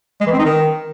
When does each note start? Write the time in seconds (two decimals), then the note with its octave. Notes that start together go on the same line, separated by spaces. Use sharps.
0.21 G#3
0.27 E3
0.33 C4
0.39 D#4
0.45 D#3